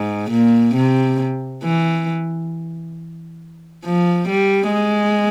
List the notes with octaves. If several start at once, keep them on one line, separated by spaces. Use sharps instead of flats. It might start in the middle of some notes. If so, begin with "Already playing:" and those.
Already playing: G#2
A#2
C3
E3
F3
G3
G#3